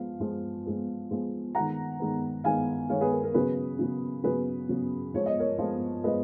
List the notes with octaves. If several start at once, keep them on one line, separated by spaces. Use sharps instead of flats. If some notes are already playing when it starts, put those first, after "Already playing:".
Already playing: F3 G#3 B3 F5
F3 G#3 B3
F3 G#3 B3
F3 G#3 B3
D#3 G#3 B3 F#5 A#5
D#3 G#3 B3
D#3 G#3 B3 F5 G#5
D#3 G#3 B3 C#5 F5
G#4 B4
A#4
A#4
C#3 F#3 B3 G#4 B4
C#3 F#3 B3
C#3 F#3 B3 G#4 B4
C#3 F#3 B3
F3 G#3 B3 C#5
D#5
A#4 C#5
F3 G#3 B3
F3 G#3 B3 B4 D#5